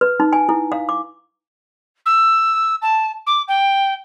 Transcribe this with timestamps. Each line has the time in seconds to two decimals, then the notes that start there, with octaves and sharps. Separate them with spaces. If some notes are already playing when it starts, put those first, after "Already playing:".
0.01 B4
0.20 D#4
0.33 G#5
0.49 E4
0.72 F5
0.89 D6
2.06 E6
2.82 A5
3.27 D6
3.48 G5